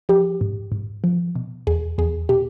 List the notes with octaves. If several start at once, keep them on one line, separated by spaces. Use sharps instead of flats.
F3 G4
G#2
G#2
F3
B2
E2 G#4
E2 G#4
B2 G4